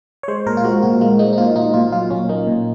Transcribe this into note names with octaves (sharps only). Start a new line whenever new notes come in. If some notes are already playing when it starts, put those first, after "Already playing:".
C#5
G#3 C5
A#2 A#4
F4
G#3 F#4
A#2 F#4
G#3 F4
G#3 D#4
D#4
A#2 F4
A#2 D#4
A#2 F4
F#3 F4
A#2 C#4
A#3 D#4
A#2